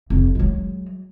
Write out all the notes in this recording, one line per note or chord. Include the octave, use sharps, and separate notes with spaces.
F1
F#3 G#3